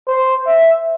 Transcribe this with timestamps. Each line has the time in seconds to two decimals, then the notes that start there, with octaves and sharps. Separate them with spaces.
0.08 C5
0.47 E5